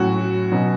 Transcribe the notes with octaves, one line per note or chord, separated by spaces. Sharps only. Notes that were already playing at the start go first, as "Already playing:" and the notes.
Already playing: A2 F#3 C#4 E4 F#4
B2 F#3 C#4